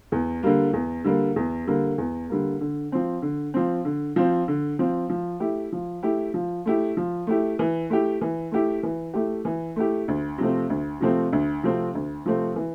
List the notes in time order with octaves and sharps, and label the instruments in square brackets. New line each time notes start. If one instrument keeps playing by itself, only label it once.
[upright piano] E2
D3 G3 A#3
E2
D3 G3 A#3
E2
D3 G3 A#3
E2
D3 G3 A#3
D3
F3 C4
D3
F3 C4
D3
F3 C4
D3
F3 C4
F3
A3 E4 G4
F3
A3 E4 G4
F3
A3 E4 G4
F3
A3 E4 G4
E3
A3 E4 G4
E3
A3 E4 G4
E3
A3 E4 G4
E3
A3 E4 G4
D2
C3 F3 A3 C4
D2
C3 F3 A3 C4
D2
C3 F3 A3 C4
D2
C3 F3 A3 C4
E3